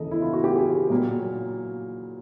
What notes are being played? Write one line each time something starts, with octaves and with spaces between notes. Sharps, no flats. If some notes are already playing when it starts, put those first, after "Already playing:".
Already playing: D#2 C#3 E3 A4 D#5
E4
F4
F#4
G4
G#4
A#2 F#3 A#3